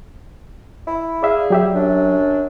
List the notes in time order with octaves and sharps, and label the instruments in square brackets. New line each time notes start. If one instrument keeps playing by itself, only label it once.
[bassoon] E4
[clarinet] G#4 [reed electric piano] D5 E5 F5
[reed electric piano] F#3 G4 E5 [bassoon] G3
[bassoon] F#2 [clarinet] D4